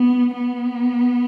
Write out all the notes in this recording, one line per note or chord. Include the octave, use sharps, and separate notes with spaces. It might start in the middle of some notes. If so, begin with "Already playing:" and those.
Already playing: B3
B3